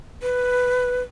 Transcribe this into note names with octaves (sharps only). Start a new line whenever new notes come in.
B4